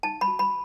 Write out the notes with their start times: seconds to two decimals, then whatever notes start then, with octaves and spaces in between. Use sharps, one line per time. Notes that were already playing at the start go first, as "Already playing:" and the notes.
0.03 D#4 A5
0.21 B5
0.28 F#4
0.39 B5